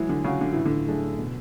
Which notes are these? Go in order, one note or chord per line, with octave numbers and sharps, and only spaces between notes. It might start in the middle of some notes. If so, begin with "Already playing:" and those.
Already playing: E3 F#3 G#3
D3
C#3 C#4 F#4
D3
A2 E3
D3
F#3 A3 D4 G#4
B2